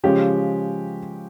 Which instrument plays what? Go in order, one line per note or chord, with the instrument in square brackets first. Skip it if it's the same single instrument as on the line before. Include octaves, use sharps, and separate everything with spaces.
[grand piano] C#3 F3 G#3 C#4 [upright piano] G4